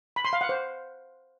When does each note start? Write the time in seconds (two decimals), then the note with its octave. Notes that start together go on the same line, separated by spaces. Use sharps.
0.16 B5
0.25 C6
0.33 F5
0.41 F#5
0.49 C5